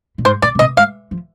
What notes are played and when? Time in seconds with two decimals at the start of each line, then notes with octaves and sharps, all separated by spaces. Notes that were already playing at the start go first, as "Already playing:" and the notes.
0.18 A#2
0.25 G#2 C5
0.42 A#2 D5
0.55 C3
0.59 A#2 D#5
0.77 G#2 F5
1.11 F3